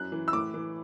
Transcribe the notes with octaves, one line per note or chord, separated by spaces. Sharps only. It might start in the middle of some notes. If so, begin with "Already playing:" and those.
Already playing: F#2 F#6
E3
E6
A2 D6
E3